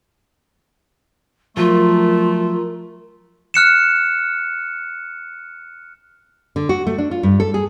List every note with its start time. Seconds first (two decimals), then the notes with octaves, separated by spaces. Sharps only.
1.57 F3 F#3 A3 F4 A#4
3.54 F6 F#6 C#7 E7
6.56 D3
6.69 F#4
6.87 A3
6.98 D4
7.11 F4
7.23 G2
7.40 A4
7.54 G#4